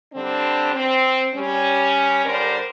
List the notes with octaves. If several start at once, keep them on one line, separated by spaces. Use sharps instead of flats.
D3 G3 C4 D4
C4
G3 C#4
D3 G3 A#4 C5 D5